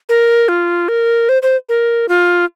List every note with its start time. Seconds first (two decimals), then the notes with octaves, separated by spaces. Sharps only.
0.09 A#4
0.48 F4
0.88 A#4
1.29 C5
1.42 C5
1.69 A#4
2.09 F4